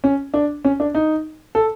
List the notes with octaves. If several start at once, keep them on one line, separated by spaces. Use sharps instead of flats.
C#4
D4
C#4
D4
D#4
A4